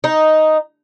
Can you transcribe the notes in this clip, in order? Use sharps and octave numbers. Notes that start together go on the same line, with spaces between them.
D#4